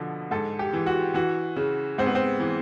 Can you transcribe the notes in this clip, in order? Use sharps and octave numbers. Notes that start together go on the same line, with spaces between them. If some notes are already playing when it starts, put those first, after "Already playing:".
Already playing: B2 D3 F3
G#2 A4
G4
E3
F#4
E3 F#4
C#3
G#2 C4
B3
C4
E3